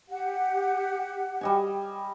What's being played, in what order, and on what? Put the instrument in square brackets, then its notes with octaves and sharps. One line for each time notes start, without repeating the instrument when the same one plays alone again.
[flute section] G4 F#5
[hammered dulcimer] G3 D#5 G#5